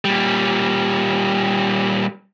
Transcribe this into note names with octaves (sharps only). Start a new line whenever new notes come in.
A#2 G3